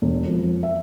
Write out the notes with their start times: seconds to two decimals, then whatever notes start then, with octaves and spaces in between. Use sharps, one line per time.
0.02 E1
0.27 F2
0.63 E5